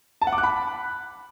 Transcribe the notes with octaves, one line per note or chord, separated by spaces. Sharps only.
A5
F#5
D6
F#6
B5